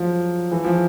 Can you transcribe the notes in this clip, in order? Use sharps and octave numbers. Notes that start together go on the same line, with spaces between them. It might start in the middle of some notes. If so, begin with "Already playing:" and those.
Already playing: F3 F#3
E3
F3